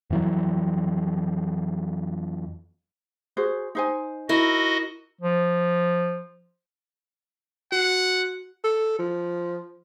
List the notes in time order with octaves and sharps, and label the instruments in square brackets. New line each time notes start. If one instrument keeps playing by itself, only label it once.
[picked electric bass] F2 E3 F#3
[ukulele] F#4 G#4 C5
D#4 C5 G#5
[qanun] E4 A#4 [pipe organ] F#4 D#5
[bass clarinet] F3
[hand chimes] F#4 [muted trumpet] F#5
[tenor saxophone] A4
F3